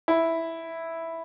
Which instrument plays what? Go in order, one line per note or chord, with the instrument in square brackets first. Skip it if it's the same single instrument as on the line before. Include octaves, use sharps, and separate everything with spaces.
[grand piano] E4